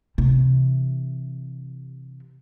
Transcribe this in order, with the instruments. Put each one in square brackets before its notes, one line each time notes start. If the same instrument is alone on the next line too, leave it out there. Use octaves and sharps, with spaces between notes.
[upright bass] C3 E3